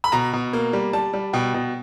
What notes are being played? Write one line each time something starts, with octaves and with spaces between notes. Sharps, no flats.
B5
B2 A#5
B2
A#3
G3
G3 A5
G3
B2 G5
B2